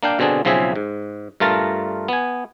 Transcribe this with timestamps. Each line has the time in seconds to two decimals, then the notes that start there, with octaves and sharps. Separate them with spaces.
0.03 A#3 D4 F5 G5
0.19 B2 D3 C4 D4 G#4
0.45 B1 C#3 F3 C4 G#4 E5
0.76 G#2
1.40 G2 A3 F4 A#4 A5 A#5
2.08 B3 G#5